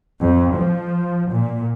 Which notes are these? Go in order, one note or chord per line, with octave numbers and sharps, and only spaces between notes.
F2
F3
A#2